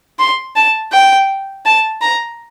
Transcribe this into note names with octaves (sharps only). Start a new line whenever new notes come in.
C6
A5
G5
A5
A#5